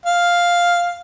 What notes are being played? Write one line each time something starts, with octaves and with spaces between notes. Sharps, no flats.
F5